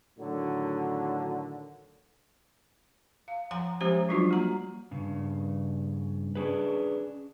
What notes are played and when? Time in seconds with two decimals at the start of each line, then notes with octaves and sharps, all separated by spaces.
0.18 A2 D3 D#3 F#3
3.28 F5
3.51 F3 F#5 G#5 A#5 C6
3.80 F3 G#3 C#4 G4 C5 A#5
4.09 F#3 G3 D4 F4 F#4
4.31 A#3 A#5
4.91 G2 C#3
6.35 C#4 D4 G#4 B4